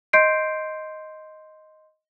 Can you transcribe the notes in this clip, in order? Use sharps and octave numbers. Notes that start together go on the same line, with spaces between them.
D#5 C6 G6 C7 D7